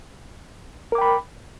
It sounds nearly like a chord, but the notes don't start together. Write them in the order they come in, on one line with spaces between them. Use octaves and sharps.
A#4 D6 G5 B5